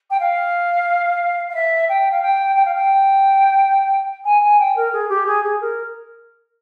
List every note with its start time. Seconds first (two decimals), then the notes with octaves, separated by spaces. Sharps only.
0.10 G5
0.20 F5
1.50 F5
1.55 E5
1.89 G5
2.11 F5
2.22 G5
2.56 G5
2.65 F5
2.75 G5
4.25 G#5
4.41 G#5
4.60 G5
4.76 A#4
4.93 G#4
5.09 G4
5.26 G#4
5.44 G#4
5.61 A#4